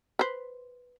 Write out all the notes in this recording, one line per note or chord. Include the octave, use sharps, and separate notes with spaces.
B4 C5